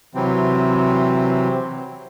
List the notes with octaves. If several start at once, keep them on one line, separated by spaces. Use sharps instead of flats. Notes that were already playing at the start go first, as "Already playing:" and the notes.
C3 E3 F#3 C4